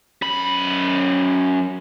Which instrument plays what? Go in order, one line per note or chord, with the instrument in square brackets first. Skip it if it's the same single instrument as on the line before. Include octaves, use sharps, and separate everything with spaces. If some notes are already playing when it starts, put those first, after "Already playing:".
[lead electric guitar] F#2 B5